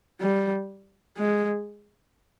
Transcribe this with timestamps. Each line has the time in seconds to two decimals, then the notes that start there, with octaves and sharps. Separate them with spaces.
0.21 G3
1.18 G#3